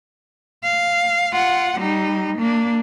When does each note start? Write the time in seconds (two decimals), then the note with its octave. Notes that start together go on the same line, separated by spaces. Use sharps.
0.63 F5
1.33 F4 F#5
1.80 G3 D#4
2.38 A#3 D4